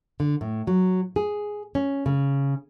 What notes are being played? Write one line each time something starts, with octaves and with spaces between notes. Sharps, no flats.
D3
A2
F#3
G#4
C#4
C#3